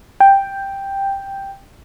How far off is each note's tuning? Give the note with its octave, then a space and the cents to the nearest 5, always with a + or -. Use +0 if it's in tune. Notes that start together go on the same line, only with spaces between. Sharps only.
G5 +5